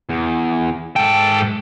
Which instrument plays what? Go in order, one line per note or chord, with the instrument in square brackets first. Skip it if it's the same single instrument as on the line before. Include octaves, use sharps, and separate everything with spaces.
[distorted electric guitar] E2
[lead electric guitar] G#2 G5 [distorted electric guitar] A4